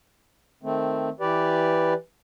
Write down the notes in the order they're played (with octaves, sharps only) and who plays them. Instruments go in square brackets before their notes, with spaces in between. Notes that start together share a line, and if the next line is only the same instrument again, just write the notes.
[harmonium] D#3 A3 C4
E3 G4 B4 D5